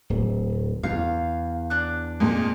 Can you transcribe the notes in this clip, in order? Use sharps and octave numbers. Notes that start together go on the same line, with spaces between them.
D1
E2 F5
D4 F#6
F2 A#2 G#3